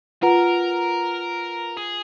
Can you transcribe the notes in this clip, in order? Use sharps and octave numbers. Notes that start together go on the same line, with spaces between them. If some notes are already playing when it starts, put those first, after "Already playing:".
F4 A#4 B4 F#5 A#5
G#4